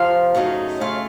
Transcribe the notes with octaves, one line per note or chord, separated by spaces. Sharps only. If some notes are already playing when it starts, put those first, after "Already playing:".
Already playing: F2 C3 F3 F5
F#2 C#3 F#3 A3 D#4
C#3 A3 C#4 F4 F5